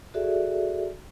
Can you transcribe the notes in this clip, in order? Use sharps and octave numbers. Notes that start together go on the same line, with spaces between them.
F#4 G#4 A4 D5 E5